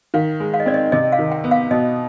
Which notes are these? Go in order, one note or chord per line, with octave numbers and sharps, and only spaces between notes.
D#3 F5
G#3
F5
D#5
C4 D5
D#5
C3 D#5
F5
D#3
G5
B3
F5
B2 D#5